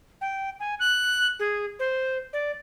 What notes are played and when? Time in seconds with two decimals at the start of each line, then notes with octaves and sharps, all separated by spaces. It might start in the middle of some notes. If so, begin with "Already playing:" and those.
0.21 G5
0.60 G#5
0.80 F#6
1.39 G#4
1.79 C5
2.33 D5